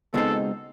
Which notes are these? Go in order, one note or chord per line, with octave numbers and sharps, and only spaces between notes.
C#2 B2 G#3 C4 D#4 A4